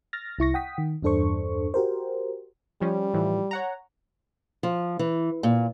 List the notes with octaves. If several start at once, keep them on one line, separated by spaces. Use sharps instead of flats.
F6 A6 A#6
C2 E4 C#6 A#6
F#5 G5 D#6 B6
D#3
E2 G2 D4 A4 C5 C#6
F#4 G4 A#4 C5
F3 G3 C#4
A2 E3 F3
C#5 F#5 A#5
F3
E3
A#2